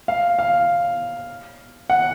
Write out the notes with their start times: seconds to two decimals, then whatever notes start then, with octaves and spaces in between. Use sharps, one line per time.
0.08 F5
0.39 F5
1.90 F#5